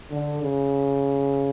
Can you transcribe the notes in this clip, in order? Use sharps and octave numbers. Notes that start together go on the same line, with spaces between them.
D3
C#3